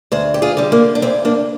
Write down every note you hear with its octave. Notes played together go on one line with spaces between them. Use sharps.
D2 G#4 C5
G4
F4 G#4
D3 G3
A#3
D4
D2 C4
A#3 D4